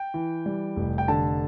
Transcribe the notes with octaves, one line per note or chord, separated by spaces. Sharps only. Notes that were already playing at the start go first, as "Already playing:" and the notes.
Already playing: G5
E3
G3
F1
G5
D3 A5